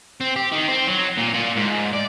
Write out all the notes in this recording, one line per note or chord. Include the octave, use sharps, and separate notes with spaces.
C4
G4
D#3
C4
F#3
A#2
A#2
G#2
D5